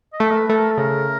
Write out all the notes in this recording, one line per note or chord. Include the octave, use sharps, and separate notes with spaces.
D#5
A3 E5
A#4
B4
A3
A#4
A4
C#3 A#4